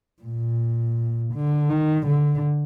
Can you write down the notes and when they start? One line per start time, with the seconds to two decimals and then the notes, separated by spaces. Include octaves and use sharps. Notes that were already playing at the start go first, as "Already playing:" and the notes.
0.23 A#2
1.34 D3
1.70 D#3
2.07 D3